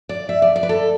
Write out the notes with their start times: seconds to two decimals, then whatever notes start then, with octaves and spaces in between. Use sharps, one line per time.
0.09 D5
0.29 E5
0.42 D5
0.56 D5
0.63 B4
0.69 A4